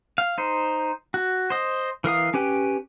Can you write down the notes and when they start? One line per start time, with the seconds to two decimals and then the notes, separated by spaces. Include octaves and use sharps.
0.18 F5
0.38 D#4 C5
1.14 F#4
1.50 C5 D#5
2.04 E3 A#4 F5 D#6
2.34 C#4 G4 B4 G5